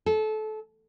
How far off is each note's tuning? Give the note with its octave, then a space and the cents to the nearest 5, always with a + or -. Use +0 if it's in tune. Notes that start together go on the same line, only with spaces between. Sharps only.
A4 -25